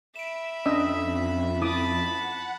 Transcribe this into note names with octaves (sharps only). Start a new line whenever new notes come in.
E5 B5 D7 E7
F2 C#4 D4 D#5 E6
E4 A5 B5 D6 D#6
F#5